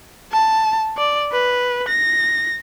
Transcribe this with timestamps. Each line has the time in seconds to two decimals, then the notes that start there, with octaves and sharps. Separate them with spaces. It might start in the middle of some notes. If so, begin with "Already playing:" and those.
0.32 A5
0.97 D5
1.32 B4
1.88 A#6